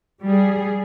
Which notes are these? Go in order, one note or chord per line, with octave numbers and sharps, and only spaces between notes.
G3 G#4